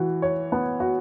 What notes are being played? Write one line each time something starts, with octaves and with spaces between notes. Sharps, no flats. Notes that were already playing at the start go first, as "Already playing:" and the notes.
Already playing: E3 F#4
C#5
B3
F#4